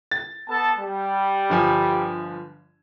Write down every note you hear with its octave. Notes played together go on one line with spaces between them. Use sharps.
A6
B3 A4 A5
G3
G1 F3 G#5